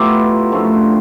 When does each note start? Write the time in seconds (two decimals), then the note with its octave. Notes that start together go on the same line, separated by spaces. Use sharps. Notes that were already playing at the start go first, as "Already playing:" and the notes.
Already playing: A2 F#3 B3 E4 F4 G4
0.52 F#2 D3 F3 A3